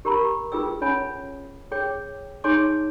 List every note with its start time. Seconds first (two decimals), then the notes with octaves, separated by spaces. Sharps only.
0.05 G4 A#4 A#5 B5
0.52 F4 G#4 B4 G5 E6
0.81 C#4 C#5 G#5 B5
1.71 G#4 C#5 G5 D6
2.44 D#4 G#4 C#5 G#5 C6 D6